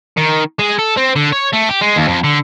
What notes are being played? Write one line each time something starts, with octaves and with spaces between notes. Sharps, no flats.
D#3
G#3
A4
C4
D3
C#5
A3
G4
G#3
D#2
F2
D3